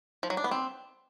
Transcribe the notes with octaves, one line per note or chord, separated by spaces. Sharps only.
F3
F#3
D4
B3
C4